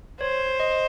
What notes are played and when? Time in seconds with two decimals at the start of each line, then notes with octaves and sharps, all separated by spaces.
0.21 C5 C#5
0.60 D#5